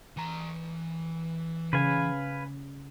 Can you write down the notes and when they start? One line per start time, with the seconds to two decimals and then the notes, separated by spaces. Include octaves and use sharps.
0.17 E3 A#5
1.73 C#3 B4 F5 G#5